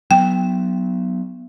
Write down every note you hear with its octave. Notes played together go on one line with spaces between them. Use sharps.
F#3 B3 G5